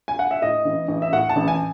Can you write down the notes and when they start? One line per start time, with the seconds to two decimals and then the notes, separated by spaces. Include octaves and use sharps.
0.08 G#5
0.19 F#5
0.31 E5
0.42 A2 D#5
0.65 A1
0.88 A1
1.02 E5
1.12 A2 F#5
1.29 A5
1.36 A1
1.48 G#5